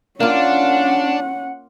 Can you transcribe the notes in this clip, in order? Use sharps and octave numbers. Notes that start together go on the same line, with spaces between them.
A#3 C#4 D4 F4 F#5